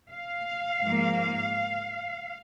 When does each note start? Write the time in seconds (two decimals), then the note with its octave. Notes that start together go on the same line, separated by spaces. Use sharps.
0.13 F5
0.82 G#2 F3 A#3